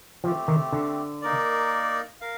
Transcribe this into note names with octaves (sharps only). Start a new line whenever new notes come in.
F3 A3 C4 G4
D#3
D3
A#3 D#4 A#4 D5
A#4 F5